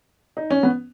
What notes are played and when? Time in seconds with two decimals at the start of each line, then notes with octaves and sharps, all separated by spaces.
0.37 D#4
0.50 C#4
0.63 B3